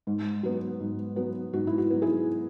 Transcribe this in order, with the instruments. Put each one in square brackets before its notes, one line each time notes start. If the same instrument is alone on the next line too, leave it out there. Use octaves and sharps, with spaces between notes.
[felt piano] G#2
F#3 B3
G#2
F#3 B3
G#2 F#4
E4
F#4
F#3 B3
E4 G#4